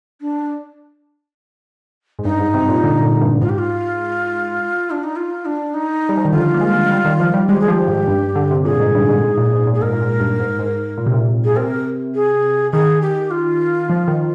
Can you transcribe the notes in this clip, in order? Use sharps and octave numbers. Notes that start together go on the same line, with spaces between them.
D4
G#2
G2 D#4
G#2
C3
A#2
D3
A#2
G2
G#2 F4
G4
F4
D4
D#4
F4
D4
D#4
G3
F3
D#3
D3 F4
A#3
G#3
G3
D#3
F3
G3
G#3 G4
G#4
F3 G4
G#2
G2
D3
C3
A#2 G#4
G#2
G2
G#2
G#2
A#2
G#2
A#2
G#4
G#2 A#4
A#2
G#2
G2
G#2
G#2
A#2
C3
A#2
G#4
C3 A#4
G#4
D#3 G#4
G4
F4
F3
D#3